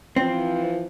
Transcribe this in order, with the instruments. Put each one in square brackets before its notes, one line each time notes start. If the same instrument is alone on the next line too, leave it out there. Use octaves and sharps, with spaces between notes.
[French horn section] E3 F3 [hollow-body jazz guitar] C4